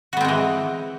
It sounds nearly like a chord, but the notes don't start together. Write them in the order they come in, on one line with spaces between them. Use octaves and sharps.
F#4 B3 C4 G#3 E3